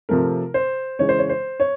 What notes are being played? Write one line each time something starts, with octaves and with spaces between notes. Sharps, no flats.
C3 F3 A3 A#4
C5
C#3 E3 G#3 C#5
C5
C#5
C5
C#5